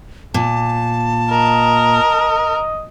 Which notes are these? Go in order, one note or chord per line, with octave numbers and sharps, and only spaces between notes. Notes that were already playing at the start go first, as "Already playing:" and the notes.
A#2 A5
A#4 D#5